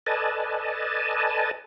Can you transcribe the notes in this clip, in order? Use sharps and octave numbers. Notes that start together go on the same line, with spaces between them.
A4 B4 D5 D#5 G#5 A5